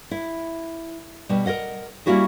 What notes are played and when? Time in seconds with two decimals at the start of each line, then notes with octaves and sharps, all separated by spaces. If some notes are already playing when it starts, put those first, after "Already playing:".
0.11 E4
1.29 B2 G3
1.46 A#4 C#5 D#5 F#5
2.06 G3 A#3 C#4 E4 F#4 G#4